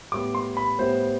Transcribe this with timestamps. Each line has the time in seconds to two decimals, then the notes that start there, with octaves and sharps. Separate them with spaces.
0.12 A2 G3 B3 D6
0.35 C6
0.57 B5
0.79 A2 G3 B3 C5